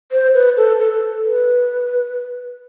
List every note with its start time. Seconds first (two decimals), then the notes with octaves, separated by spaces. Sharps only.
0.12 C5
0.34 B4
0.57 A4
0.79 A4
1.24 B4